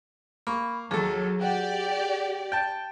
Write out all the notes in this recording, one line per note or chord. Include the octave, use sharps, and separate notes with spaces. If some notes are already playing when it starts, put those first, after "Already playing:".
A#3 B5 C#6
D#2 F#3 G#4 A4
F#4 G4 D5
G5 A5